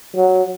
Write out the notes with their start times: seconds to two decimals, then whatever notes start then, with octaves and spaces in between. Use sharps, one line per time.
0.16 F#3